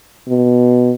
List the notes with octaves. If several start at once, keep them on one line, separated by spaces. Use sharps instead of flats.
B2